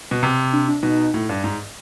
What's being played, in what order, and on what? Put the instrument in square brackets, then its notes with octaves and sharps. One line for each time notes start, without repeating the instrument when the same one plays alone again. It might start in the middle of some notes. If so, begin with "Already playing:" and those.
[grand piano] B2
C3
[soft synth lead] D4
D4
[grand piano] B2 [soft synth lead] D#4
[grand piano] A2
G2
G#2